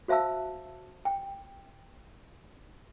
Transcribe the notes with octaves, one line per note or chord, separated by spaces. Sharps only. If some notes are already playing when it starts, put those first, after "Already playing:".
F#4 C5 E5 F5 A5 E6
G5